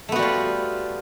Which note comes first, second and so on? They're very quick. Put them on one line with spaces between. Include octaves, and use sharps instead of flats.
A3 B3 F#4 G3 F4